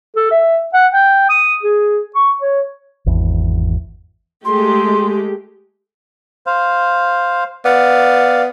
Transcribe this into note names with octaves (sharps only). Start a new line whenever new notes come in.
A4
E5
F#5
G5
D#6
G#4
C#6
C#5
G#1 E2
G#3 A3 G4 C6
C5 F5
B3 D5 F5